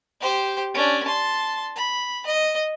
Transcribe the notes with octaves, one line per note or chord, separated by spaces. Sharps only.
G4 C5
C#4 D4
A5 C6
B5
D#5